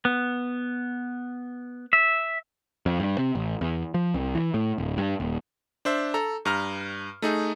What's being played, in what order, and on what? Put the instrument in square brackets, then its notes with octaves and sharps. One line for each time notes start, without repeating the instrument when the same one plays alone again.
[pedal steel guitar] B3
E5
[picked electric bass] F2
G2
C3
A1
E2
F3
C2
E3
A2
D1
G2
D#1
[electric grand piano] D4 C5 E5
A4 A#5
G2 A#5 F6
A3 D#4 G#4